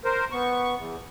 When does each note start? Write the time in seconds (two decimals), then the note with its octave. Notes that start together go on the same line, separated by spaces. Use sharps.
0.05 A#4 C5
0.32 B3 C#6
0.76 E2